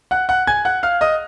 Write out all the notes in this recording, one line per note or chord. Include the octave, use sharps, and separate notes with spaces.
F#5 F#6
F#5 F#6
G#5 G#6
F#5 F#6
F5 F6
D#5 D#6